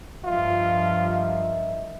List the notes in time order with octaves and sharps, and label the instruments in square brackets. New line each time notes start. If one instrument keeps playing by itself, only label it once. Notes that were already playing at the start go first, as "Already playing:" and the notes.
[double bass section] G2 F3 [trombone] F4 [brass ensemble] A#4 D#5 E5